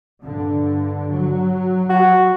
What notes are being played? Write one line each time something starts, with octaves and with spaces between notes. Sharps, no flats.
G2 D3
F#3
F#4